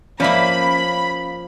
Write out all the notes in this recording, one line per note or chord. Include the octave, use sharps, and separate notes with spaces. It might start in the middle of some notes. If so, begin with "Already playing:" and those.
F3 A#3 C#4 D5 E5 B5